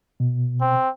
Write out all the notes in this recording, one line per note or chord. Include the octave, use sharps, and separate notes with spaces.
B2
C4